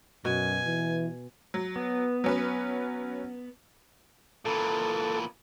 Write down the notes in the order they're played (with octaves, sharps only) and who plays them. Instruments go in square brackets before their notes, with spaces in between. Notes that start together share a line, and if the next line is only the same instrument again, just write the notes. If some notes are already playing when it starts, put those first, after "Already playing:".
[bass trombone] F#2 [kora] B2 [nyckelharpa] G#5
[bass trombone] E3
[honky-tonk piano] F#3
[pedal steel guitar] B3
[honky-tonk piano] F#3 C#4 B4
[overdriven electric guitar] A#2 E3 [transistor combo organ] A4